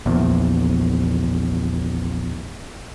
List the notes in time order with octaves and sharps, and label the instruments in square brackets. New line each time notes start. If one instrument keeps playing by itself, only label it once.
[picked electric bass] A#1 E2